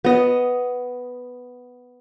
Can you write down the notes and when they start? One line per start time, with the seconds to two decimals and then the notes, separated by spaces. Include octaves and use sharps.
0.05 B3 D#5